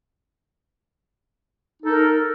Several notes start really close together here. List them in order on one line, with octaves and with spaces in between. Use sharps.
D#4 A4 A#4